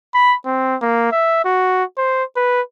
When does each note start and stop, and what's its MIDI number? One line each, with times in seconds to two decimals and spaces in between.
0.14 0.35 83
0.46 0.76 60
0.82 1.11 58
1.12 1.44 76
1.45 1.84 66
1.98 2.23 72
2.36 2.61 71